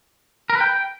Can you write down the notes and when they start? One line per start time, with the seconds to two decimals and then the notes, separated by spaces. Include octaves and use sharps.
0.50 A#4
0.55 B4
0.60 G5